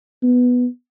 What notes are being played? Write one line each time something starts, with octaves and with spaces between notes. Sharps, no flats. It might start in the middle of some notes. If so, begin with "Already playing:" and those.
B3